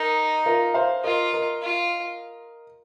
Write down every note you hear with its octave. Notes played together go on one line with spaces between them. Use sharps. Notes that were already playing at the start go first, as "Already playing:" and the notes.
Already playing: D#4 A#4 D#5
F4 A#4
C5 F5
F4 A#4 D#5
A#4 D#5
F4